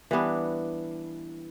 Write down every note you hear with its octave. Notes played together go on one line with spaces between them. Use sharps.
E3 G3 B3 D4